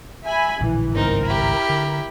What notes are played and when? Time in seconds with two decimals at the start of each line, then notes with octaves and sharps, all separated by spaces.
0.24 E5 G#5 B5
0.61 A#1 A2 D3 E3
0.95 G#1 C#2 G2 C4 D#4 A#4
1.25 E4 G4
1.70 D3